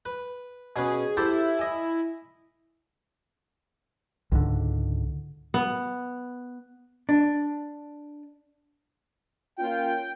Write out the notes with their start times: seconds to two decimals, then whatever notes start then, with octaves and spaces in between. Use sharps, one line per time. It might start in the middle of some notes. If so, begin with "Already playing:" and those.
0.06 B4
0.76 B2 C#4 G#4 B4
1.17 E4 G4 A4 C5
1.59 D#5 G#5
4.32 C#2 G#2 D3
5.54 B3
7.09 D4
9.59 A#3 C#4 F4 G5